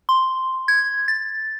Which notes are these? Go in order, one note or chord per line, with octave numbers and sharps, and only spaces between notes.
C6
G#6
A6